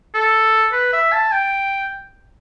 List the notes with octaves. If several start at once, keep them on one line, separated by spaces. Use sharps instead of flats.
A4
B4
E5
A5
G5